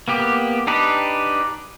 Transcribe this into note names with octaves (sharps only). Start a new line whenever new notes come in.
A#3 B3 G4
D4 D#4 G4 B4